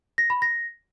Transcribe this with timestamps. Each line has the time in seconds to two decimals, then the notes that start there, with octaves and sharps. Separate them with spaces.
0.18 A#6
0.30 B5
0.42 A#6